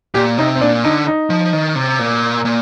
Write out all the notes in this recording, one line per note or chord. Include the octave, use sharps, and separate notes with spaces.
A#2 G4
C3 D#4
C4
A#2 D4
D3 D#4
D#4
F3
D#3
C3
A#2
A#2